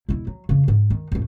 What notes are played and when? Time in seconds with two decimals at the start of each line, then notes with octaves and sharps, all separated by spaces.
0.09 E1 E4
0.27 F#3
0.49 F2 C#3
0.68 G#2
0.90 D#3
1.12 F2 A2